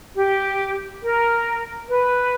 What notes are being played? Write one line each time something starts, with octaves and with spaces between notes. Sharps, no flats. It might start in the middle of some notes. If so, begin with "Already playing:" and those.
G4
A#4
B4